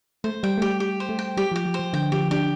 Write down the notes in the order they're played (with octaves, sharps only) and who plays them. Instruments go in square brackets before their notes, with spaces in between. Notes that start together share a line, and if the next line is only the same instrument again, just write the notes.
[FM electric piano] A3 [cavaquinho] C5
[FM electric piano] G3 [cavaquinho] G5
[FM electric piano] A3
[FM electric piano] G3 [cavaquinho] G4
[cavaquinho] G4
C5
[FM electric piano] A3
[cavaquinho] G5
[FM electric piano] G3 [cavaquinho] G4
[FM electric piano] F3
[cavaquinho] G4
[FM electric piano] F3
[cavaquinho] C5
[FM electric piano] F3
[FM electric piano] D3 [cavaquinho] G5
[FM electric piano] F3 [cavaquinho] G4
[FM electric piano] D4 [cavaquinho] G4